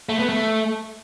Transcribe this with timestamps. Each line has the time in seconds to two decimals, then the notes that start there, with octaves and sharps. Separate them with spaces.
0.09 A3
0.19 B3
0.29 A3